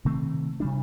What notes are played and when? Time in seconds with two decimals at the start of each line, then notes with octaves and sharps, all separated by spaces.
0.05 C3 D#3 A3 C4
0.60 C3 G3 D4